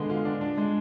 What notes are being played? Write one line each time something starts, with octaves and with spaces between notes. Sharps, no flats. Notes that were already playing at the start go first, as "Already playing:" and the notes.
Already playing: D3 G#3 B3
F4
D4
D4
G#3